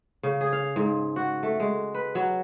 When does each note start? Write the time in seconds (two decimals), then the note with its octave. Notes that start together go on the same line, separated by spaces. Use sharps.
0.23 C#3
0.41 G#4
0.53 F5
0.76 G#2
1.16 F#4
1.43 A3
1.60 G#3
1.94 B4
2.15 F#3